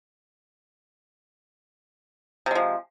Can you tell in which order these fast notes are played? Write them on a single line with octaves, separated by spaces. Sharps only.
C3 G#3 F3